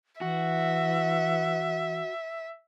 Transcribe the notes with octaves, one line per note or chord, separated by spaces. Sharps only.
E3 F#4 E5